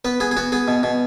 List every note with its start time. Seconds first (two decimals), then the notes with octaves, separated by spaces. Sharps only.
0.05 B3 B4
0.20 B3 G#4
0.31 G#4
0.37 B3 F#4
0.52 B3 G#4
0.68 B2
0.83 B2